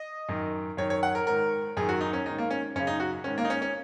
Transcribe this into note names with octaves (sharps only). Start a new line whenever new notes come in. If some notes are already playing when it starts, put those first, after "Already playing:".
Already playing: D#5
F#2 D#3
F#2 D#3 C#5
C#5
F#5
A#4
G#2 D#3 A#4
F#2 D#3 G#4
F#4
D#4
C#4
G#2 D#3 D#4
A#3
C#4
F#2 C#3 C#4
D#4
F#4
G#2 D#3 C#4
A#3
D#4
C#4
C#4